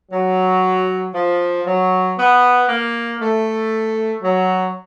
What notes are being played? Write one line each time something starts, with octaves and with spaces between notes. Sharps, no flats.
F#3
F3
F#3
B3
A#3
A3
F#3